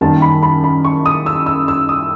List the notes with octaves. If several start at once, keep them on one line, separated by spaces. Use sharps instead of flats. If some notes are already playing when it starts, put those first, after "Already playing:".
F#2 D#3 G3 A#3 A5
B5
B5
B5
C#6
D#6
E6
E6
E6
D#6